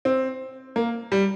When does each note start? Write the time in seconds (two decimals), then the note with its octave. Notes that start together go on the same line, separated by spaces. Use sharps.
0.05 C4
0.76 A#3
1.12 G3